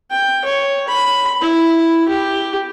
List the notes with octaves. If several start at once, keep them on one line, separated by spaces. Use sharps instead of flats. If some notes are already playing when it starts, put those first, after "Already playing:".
G5
C#5
B5
E4
G4